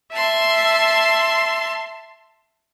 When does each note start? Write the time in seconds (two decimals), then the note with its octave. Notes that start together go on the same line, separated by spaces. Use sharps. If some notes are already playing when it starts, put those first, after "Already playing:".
0.12 E5 A5 C6